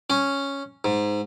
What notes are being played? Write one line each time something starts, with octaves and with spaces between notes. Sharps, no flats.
C#4
G#2